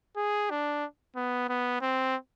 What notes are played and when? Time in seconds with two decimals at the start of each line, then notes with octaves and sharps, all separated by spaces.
0.17 G#4
0.50 D4
1.16 B3
1.49 B3
1.81 C4